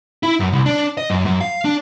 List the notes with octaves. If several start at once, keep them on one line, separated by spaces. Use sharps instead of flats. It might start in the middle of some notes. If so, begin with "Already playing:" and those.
E4
F#2
C2
D4
D#5
F#2
F#2
F5
D4